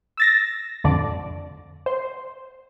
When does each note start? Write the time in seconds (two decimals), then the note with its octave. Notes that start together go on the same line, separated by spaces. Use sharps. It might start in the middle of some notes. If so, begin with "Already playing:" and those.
0.17 E6 A6 A#6
0.84 A1 F2 D3 D5
1.86 C5